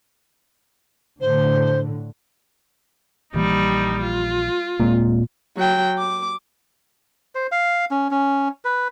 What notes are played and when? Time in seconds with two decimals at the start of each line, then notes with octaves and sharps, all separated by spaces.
1.20 A2 D3 C5
3.34 A#1 E3 G3 A#3 D#4
4.01 F4
4.80 D#1 A#2 G#3 C4
5.57 F#3 G5
5.98 D6
7.35 C5
7.52 F5
7.91 C#4
8.11 C#4
8.65 B4